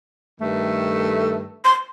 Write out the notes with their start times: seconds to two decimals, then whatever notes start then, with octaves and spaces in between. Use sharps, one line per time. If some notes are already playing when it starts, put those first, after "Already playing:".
0.39 G2 D#3 A3
1.65 C6